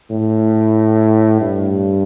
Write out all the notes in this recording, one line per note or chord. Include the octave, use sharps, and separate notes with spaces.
A2
G2